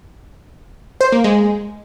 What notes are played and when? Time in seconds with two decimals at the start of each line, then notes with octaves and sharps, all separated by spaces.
1.01 C5
1.12 A#3
1.24 G#3